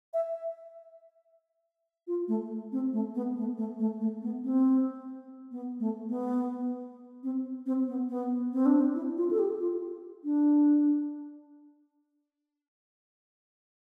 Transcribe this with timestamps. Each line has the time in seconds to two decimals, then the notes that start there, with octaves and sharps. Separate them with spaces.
0.14 E5
2.07 F4
2.28 A3
2.72 C4
2.93 A3
3.15 B3
3.37 A3
3.58 A3
3.79 A3
4.00 A3
4.22 B3
4.44 C4
5.52 B3
5.80 A3
6.09 B3
7.23 C4
7.66 C4
7.88 B3
8.09 B3
8.53 C4
8.66 D4
8.80 C4
8.95 E4
9.17 F4
9.31 A4
9.39 G4
9.60 F4
10.24 D4